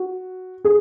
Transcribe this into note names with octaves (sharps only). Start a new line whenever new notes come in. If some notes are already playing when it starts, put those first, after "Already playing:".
Already playing: F#4
G#4